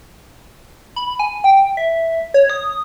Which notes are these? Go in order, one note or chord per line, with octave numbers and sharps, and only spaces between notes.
B5
G#5
G5
E5
C#5
D#6